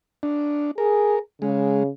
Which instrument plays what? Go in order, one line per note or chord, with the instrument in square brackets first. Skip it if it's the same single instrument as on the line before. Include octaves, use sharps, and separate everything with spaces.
[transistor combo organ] D4
[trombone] G#4 [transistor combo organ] A#4
[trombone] C#3 [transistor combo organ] G#3